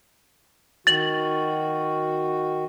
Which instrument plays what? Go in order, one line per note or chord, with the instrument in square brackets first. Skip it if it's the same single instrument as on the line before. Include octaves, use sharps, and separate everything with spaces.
[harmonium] D#3 F#4 [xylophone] A6 F#7